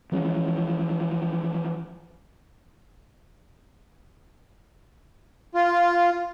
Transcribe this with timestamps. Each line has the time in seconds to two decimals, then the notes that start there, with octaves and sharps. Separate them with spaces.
0.12 E3 F3 G#3 C#4
5.54 F4